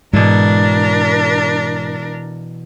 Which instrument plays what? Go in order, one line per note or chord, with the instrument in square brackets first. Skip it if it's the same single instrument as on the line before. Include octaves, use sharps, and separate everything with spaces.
[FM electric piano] G#2 [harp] B2 E3 [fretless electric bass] G#3 [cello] D4 A#4